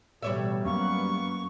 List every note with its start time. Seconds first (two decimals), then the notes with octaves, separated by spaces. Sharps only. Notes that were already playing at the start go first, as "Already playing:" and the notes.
0.23 A1 B2 G3 C#5 E5
0.65 F#2 A#3 B3 C#6